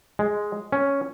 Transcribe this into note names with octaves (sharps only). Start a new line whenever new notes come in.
G#3
C#4